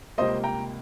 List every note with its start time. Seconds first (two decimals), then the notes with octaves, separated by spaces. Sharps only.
0.18 C#2 C3 G3 A#3 C5 D#5
0.44 G5 A#5